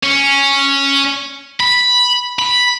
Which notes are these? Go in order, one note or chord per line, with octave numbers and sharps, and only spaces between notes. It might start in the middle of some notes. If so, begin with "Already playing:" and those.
C#4
B5
B5